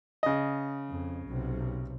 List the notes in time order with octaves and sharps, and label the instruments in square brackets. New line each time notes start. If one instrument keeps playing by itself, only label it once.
[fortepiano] C#3 D#5
[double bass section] F2
B1 C3